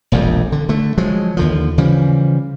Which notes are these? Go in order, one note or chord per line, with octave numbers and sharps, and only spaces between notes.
E1 A#1 F2 G3
D3
D3 A3
F3 F#3 G#3
D#2 D3 F3
C#3 E3 F3 G3